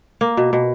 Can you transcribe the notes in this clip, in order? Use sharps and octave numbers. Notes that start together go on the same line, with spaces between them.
A#3
B2
B2